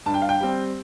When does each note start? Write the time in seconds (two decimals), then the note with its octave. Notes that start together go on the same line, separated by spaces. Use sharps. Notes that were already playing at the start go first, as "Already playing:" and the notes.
0.06 G2 A5
0.14 G5
0.22 F5
0.29 G5
0.41 G3 C4